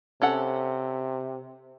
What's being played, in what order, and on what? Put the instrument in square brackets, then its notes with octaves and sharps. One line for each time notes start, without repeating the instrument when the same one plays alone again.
[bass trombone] C3 [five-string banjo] C#4 A4 F#5